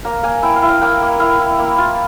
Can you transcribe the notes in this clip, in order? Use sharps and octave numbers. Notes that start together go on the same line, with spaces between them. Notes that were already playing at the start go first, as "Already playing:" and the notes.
A#3 A#5
A#3 G#5
E4 G5
F5
E4
F5
A#3 G5
A#3
E4 F5
E4
A#3
F4